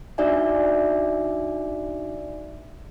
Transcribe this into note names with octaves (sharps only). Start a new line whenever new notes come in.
D4 D#4 F#4 D5 E5 G#5